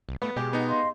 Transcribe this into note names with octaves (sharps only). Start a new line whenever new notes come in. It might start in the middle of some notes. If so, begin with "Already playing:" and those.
C2
A3 B3
B2 G#3 G4
B3 D#4
D#5 F5 C6